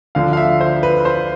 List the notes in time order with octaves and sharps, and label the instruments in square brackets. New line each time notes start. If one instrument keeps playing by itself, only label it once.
[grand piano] D2 D3 F3 F5
F5
E5
C5
B4
C5